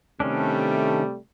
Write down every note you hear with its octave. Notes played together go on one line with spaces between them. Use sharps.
C3 D#3 G3 A3 C#4 D4